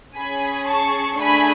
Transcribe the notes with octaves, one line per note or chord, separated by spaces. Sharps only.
C#4 G#4 G#5 B5
A5 C#6
A3 D4 G#4 G#5 B5